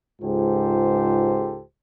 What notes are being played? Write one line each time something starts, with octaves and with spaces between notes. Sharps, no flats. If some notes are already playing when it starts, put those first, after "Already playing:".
C#2 G#2 F4 G4 A4 C5